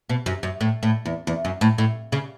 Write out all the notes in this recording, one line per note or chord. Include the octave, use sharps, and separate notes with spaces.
B2
F#2
F#2
A2
A2
E2
E2
F#2
A2
A2
C#3